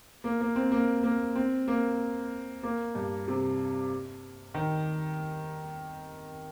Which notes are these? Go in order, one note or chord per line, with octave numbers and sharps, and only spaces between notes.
A#3
A#3
C4
A#3
A#3
C4
A#3
A#3
G2
C3
D#3